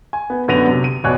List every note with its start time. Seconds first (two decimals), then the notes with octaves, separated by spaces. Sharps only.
0.13 G#5
0.30 B3
0.48 F#2 D3 B3 A#6 D#7 F7
0.66 C3 F#3
0.84 D#7
1.04 F1 B2 C#5 D5 G#5 F#6